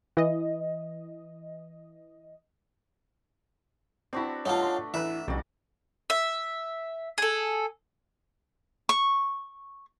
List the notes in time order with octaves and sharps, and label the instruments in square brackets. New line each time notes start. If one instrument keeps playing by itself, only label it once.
[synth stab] E3 D#5
[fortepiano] C4 E4 [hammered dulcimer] D4 F#4 B4
[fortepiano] G2 [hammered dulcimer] A3 D4 [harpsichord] D#4 F4 [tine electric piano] C#5 F#5 A5
[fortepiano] C6
[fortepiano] A1 B4 F#6 [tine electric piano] E4 [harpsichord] E5
[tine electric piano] B1 [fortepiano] F2 C3 E3 [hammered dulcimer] F#4 D5
[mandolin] E5
G#4 A4
[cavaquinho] C#6